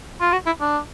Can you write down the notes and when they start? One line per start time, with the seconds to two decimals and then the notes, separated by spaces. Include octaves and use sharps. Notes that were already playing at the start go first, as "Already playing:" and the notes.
0.20 F4
0.32 F#4
0.46 E4
0.61 D4